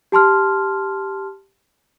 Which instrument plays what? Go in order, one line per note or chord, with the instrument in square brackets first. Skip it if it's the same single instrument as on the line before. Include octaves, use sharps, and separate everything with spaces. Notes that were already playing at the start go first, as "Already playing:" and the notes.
[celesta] G4 A5 C6 F6